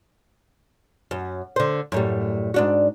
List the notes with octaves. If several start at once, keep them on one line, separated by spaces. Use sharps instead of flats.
F#2
D3 C5
F#2 A2 G3
G#2 D4 F#4